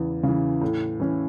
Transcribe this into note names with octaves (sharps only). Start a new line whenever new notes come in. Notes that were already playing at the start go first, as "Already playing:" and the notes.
Already playing: E2 C#3 E3
C#3
E3
A2
E3 C#4